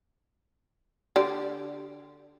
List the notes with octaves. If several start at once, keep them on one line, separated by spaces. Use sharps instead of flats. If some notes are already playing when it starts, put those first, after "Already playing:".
D3 G4 D5